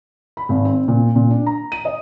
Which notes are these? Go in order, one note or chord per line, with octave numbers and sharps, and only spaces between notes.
B5
G#1
C4
A#2
A#2
D4
A#5
D#7
D#5